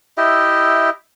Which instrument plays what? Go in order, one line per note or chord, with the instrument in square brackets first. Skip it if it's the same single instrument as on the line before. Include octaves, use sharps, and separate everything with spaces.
[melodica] E4 G4 D#5 E5